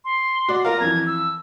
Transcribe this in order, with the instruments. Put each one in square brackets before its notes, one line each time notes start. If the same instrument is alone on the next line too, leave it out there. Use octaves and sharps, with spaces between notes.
[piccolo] C6
[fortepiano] F#4 D5
[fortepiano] F4 A#4 F5 [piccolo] A#5
[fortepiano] F2 E3 [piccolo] G#6
[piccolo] E6